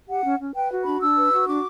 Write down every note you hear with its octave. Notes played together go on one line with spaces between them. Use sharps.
G4 F#5
C#4
C#4
B4 G5
F#4
D4 B5
D4 E6
B4
F#4
D4 D6